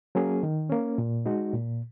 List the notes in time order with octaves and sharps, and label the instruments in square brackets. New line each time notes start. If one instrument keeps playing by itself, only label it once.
[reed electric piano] F#3 A#3 C#4 G#4
D#3
A#3 C#4
A#2
G#3 D#4 F#4
A#2